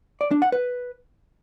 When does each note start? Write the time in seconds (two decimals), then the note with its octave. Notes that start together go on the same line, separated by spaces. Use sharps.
0.21 D5
0.31 D4
0.42 F#5
0.52 B4